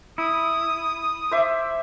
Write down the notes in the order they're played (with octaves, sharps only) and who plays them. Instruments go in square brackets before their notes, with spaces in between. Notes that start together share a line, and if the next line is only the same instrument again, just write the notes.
[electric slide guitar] E4 [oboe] D#6
[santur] C5 E5 D6